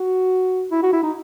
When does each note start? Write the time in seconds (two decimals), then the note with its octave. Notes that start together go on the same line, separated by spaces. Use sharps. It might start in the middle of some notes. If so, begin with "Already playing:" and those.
Already playing: F#4
0.71 E4
0.83 F#4
0.93 E4
1.03 D#4